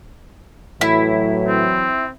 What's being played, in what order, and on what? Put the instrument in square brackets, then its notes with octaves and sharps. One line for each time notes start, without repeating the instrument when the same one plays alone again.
[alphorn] A2 [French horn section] E3 F#3 [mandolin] E4
[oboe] C4